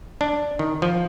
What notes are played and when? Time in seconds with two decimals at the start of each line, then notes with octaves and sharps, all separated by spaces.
0.21 D4
0.59 D#3
0.82 F3